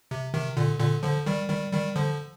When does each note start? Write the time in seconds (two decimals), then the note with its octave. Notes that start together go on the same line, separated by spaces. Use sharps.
0.11 C3
0.33 C3 D#3
0.57 A#2 D3
0.80 A#2 D3
1.03 D3 F3
1.26 D#3 G3
1.50 D#3 G3
1.73 D#3 G3
1.96 D3 F3